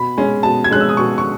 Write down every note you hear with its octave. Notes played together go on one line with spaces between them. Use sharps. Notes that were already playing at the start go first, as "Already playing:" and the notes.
Already playing: B2 B5
G#3 C#4
B2 A5
G#6
G#3 C#4 F#6
E6
D#6
B2 C#6
C#6